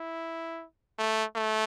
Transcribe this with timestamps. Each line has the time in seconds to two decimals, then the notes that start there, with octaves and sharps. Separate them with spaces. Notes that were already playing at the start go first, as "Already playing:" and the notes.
Already playing: E4
0.99 A3
1.36 A3